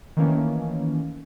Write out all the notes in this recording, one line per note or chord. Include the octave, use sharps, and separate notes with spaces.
D#3 E3 A3 A#3 C#4